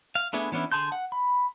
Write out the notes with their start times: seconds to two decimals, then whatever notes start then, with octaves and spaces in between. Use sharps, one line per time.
0.15 F5
0.33 A3 B3 D4 E4 G#4
0.52 E3 B3 C#4 D4 E4
0.72 D3 G#4 A5 C6 G6
0.92 F#5
1.12 B5